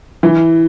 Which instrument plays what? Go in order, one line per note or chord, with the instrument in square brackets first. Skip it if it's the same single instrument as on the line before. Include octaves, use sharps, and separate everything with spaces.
[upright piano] E3